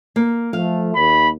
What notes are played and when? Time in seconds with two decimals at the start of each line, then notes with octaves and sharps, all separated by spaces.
0.16 A#3
0.53 F3 A3 F5
0.95 D#2 B5